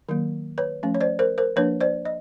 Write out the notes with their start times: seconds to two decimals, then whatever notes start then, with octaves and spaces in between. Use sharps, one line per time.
0.09 D#3 F#3 A#3
0.58 B4 C#5
0.83 F3 A3 C#4
0.94 C#5
1.01 C5 D5
1.19 A#4 C5
1.38 A#4 C5
1.56 F3 A#3 D4 B4 C#5
1.81 C5 D5
2.05 D#5